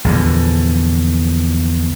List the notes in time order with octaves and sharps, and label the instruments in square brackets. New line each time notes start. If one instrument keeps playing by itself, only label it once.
[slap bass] A#1 E2 D3